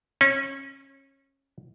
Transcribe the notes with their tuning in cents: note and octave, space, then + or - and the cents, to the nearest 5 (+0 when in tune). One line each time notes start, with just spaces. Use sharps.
C#4 -25